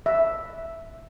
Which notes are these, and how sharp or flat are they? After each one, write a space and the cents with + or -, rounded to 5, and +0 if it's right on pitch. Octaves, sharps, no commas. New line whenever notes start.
E5 +0